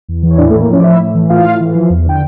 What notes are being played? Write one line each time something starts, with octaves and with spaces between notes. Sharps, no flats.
E2
E3
C#5
A2 D4 D5
A3 A4
A2
A#3 A#4
F3 C#4 C#5
D5
A2 E4 E5
A2
E3
A2 F4 F5
A2
E3
F3
E2
D3 G5